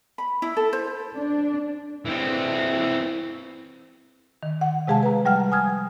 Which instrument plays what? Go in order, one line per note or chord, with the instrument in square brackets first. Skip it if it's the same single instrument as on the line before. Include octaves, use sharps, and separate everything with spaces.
[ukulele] B5
E4
A4
C5
[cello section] D4
[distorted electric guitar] E3 C4
[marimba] D#3
F#5
C3 G#3 G#4 F5 A5
B4 A#5
F3 G3 F#5 F6
G#5 D#6 F6 G#6